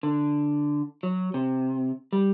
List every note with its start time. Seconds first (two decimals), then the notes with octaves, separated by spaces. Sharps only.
0.03 D3
1.03 F#3
1.34 C3
2.13 G3